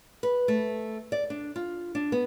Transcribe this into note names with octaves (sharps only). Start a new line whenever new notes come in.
B4
A3
D5
D4
F4
D4
B3